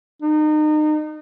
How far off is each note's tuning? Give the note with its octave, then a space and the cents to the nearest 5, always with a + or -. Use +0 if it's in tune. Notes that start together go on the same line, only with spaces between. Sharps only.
D#4 -30